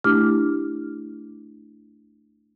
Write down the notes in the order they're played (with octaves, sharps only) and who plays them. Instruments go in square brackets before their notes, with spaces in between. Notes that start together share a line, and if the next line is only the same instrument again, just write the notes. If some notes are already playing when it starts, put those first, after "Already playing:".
[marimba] A3 D4 E4 G4 D6 F6